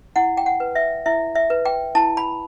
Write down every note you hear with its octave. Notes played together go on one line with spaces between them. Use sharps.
E4 F#5
G5
F#5
B4
E5
E4 E5
E5
B4
G5
E4 A5
B5